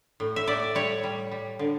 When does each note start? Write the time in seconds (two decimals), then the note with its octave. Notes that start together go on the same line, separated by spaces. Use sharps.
0.20 A2
0.36 E5
0.47 A2 D5
0.75 G3 C#5
1.04 G3
1.31 G3
1.59 D3